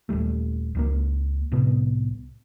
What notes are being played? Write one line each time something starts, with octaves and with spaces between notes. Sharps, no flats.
D#1 D#2 G3 A3
C#2 G3 A#3
C2 A2 C3 B3